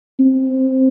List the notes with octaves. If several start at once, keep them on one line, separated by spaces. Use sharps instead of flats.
C4